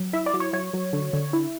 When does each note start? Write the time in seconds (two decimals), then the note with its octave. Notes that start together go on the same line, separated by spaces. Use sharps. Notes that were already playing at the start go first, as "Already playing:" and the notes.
Already playing: F#3
0.13 E4 E5
0.26 D5
0.34 F#3
0.40 C#5
0.53 F#3 C#5
0.73 F#3
0.93 D3
1.13 D3
1.33 E4